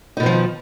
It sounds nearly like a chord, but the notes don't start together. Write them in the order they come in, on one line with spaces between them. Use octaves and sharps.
D#4 B2 D#3 F3